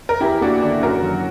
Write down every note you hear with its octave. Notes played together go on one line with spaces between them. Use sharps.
A#4
E2 E4 G4
A#3 D4 F#4
D3 D4
F#2 F#4 A#4
F#3